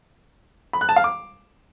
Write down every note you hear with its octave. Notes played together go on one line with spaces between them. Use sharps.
B5
F#6
A5
F5
D6